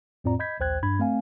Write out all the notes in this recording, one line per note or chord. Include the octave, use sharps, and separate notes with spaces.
F2 A2 C4 F4 D5 A#5
D#5 B5 G6 G#6 B6
A#1 D#2 C5 G5 F#6 G#6
G2 D4 B5 G#6
A3 C4 F5 G#5